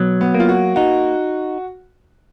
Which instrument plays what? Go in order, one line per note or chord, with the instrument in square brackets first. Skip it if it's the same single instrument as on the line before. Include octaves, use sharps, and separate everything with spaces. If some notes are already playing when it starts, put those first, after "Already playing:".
Already playing: [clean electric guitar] B2 F#3
[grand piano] B3
[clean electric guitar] A#3
[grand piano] F4
F#4
[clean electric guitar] D#4 [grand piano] F#4